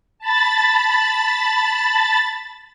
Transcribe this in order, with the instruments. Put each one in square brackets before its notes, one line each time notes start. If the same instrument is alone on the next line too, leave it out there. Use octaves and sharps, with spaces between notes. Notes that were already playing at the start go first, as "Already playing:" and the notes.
[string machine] A5 B5 A6